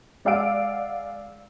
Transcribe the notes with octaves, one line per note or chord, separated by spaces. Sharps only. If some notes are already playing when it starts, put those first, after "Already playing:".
G#3 D5 F5 F#5 E6 D7